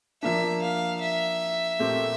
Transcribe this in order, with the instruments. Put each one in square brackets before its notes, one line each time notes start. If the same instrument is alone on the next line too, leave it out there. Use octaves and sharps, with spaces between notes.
[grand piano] F3 A#3 D4 [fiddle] E5
[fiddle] F5
E5
[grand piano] A#2 A3 C4 G4